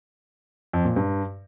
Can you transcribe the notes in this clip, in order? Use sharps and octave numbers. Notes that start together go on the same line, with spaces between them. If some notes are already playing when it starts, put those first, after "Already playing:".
F2
A#2
G2